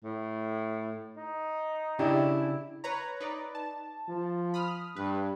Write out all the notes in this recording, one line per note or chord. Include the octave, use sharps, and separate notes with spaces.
A2
D#4
C#3 D4 E4 G4
B4 C#5 A#5
D#4 B4 D5
A5
F3
B5 D#6 F6
G2 B4